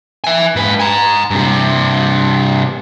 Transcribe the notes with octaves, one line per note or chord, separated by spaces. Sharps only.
E5 G#5
G#2 B4
G#5 A#5
G2 C3